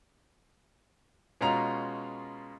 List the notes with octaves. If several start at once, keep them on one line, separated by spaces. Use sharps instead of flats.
B2 G#3 C#4 F4 A#5 F7